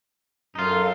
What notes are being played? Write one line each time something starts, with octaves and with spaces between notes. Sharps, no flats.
F#2 D#4 F4 A4 F5